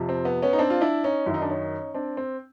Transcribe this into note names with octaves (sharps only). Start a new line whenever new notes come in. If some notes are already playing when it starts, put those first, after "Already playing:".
Already playing: F2 C3 F3
C4
B3
B3 C#4
D#4
C4 D4
F4
D4 E4
C#4 D#4
F#2 D#3 E4
D#4
D4
C#4 D#4
C4 D4
C4